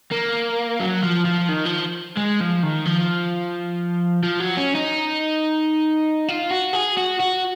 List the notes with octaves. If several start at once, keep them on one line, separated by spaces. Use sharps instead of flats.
A#3
F#3
F3
F3
D#3
F3
G#3
F3
D#3
F3
F3
F#3
C#4
D#4
F4
F#4
G#4
F#4
F#4